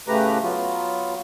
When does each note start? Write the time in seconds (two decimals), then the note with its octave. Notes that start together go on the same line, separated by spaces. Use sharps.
0.08 A2 C#3 A3 G4 B4 A#5
0.42 F#3 B3 F4